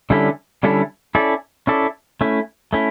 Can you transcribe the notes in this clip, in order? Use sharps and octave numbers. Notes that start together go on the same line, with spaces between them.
D3 G3 C#4 E4 A4
D3 G3 C#4 E4 A4
C#4 E4 A4 D5
C#4 E4 A4 D5
A3 C#4 E4
A3 C#4 E4